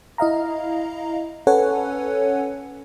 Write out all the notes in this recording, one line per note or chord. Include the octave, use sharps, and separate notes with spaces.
E4 D#5 F5 A#5
C#4 A4 B4 C#5 F#5 G#5